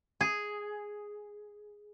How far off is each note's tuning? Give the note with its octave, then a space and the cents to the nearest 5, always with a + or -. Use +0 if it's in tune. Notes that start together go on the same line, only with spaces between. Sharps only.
G#4 +0